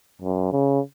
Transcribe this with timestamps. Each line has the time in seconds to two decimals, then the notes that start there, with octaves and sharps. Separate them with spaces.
0.21 F#2
0.52 C#3